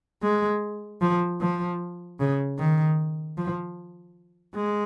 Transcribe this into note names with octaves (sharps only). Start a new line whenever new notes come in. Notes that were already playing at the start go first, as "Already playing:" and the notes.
G#3
F3
F3
C#3
D#3
F3
G#3